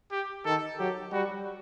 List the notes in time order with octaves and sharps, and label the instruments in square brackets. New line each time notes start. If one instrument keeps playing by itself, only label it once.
[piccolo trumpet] G4
[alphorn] D#3 [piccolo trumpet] A4
[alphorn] F#3 [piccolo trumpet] G4
[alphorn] G3 [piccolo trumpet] F#4